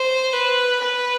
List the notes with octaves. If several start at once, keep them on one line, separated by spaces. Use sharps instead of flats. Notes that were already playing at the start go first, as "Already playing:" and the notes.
Already playing: C5
B4
B4